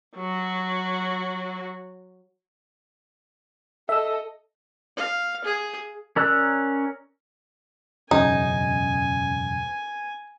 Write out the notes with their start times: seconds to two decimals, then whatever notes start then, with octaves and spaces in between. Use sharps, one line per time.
0.17 F#3 F#4
3.89 A4 D#5 E5 E6
4.96 F5
5.44 G#4
6.16 C#4 A#4 D5 E6 F#6
8.11 E1 F#2 C#3 D#4 G#5